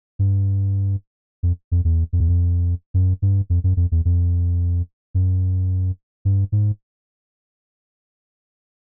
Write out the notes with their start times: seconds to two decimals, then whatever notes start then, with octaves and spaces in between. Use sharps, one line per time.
0.19 G2
1.43 F2
1.72 F2
1.85 E2
2.13 F2
2.20 E2
2.29 F2
2.94 F#2
3.22 G2
3.50 F2
3.64 F#2
3.77 F2
3.92 E2
4.05 F2
5.15 F#2
6.25 G2
6.52 G#2